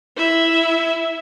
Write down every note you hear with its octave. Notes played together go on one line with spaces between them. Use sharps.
E4 E5